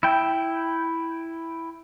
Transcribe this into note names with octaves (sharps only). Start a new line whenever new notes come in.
E4 G5